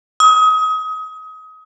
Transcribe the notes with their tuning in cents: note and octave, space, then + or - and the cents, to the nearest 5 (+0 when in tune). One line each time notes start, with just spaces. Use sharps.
D#6 +30